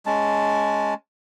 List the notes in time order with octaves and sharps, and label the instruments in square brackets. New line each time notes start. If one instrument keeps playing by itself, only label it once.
[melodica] G#3 C#4 A5